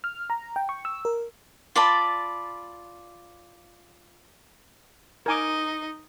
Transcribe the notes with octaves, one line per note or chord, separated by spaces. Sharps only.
F6
A#5
G5
C#6
E6
A#4
F4 D5 A5 B5
D#4 A#4 D#5 G#5 D6